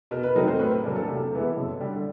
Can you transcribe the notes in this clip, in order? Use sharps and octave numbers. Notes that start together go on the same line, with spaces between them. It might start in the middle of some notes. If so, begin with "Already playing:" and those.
B2 A#4
B4
F#3 A3 C4 D#4 A#4
C5
A2 B4
A#4
F#3 A#3 D4 A4
A4
C3 A4
E3 G#3 B3 E4
F#2
D3 G3